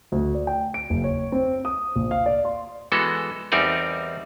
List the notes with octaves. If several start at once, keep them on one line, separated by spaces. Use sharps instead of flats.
D2
D5
G5
D7
F#1
C#5
C4
D#6
A#1
F5
D5
C6
E3 G#3 B3 F#4 A4
E2 G3 C4 D#4 A#4 D5